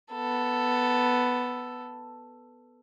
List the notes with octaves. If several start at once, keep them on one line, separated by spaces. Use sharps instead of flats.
B3 A4